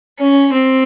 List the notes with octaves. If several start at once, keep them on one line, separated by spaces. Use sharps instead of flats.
C#4
C4